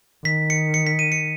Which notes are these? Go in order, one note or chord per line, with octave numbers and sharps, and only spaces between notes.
D#3 B6
C#7
C#7
B6
D#7
C#7